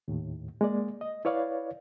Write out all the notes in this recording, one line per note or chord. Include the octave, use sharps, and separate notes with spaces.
D#2 A2
G#3 A#3 D5
D#5
E4 B4 C#5 D5 F5